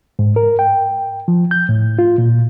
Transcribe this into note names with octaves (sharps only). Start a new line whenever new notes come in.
G#2
A#4
G5
F3
G6
A2
F4
A#2